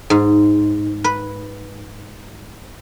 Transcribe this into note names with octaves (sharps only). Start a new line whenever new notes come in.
G#2
B4